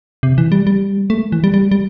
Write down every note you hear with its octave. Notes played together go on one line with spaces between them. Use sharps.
C3
E3
G3
G3
A3
E3
G3
G3
G3